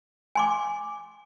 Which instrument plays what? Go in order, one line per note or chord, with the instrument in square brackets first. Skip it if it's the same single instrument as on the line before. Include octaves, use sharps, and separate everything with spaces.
[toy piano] G#5 C6 D6